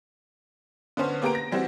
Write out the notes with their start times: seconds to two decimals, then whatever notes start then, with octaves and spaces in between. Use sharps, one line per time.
0.97 D3 B3 C#4 C5
1.22 A#3 B3 G4 G5 A#5 D7
1.35 A#6
1.52 E3 G3 C4 F#4